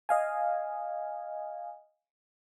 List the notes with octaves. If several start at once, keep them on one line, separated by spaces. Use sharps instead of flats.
D#5 F5 G#5